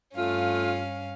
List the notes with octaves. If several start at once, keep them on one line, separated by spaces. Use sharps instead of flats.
G2 A3 C#4 F4 F5